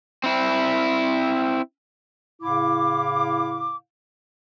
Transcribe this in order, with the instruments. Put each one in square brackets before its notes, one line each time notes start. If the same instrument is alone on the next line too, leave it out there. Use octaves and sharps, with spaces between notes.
[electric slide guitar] C4 E4
[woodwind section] A2 C#3 E4 F5 D6